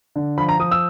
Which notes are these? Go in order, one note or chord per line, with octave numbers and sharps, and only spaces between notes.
D3
F3 B5
A#5
F3 D#6
E6